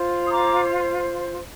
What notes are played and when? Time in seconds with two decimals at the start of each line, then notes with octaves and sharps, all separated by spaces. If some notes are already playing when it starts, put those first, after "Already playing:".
Already playing: F4 C5
0.25 D#6
0.30 A#5 D6